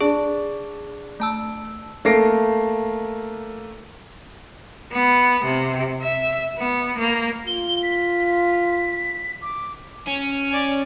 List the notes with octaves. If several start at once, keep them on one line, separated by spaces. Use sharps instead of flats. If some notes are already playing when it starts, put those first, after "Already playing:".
D4 G#4
A3 A5 E6
A3 A#3 A#6 C7 D7
B3
C3
E5
B3
A#3
F4 G7
B6
D6
C#4
D5 G#5